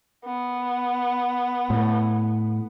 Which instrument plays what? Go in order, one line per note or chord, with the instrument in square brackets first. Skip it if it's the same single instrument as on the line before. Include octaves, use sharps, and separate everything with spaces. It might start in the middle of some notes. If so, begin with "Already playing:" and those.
[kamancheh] B3
[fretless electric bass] A2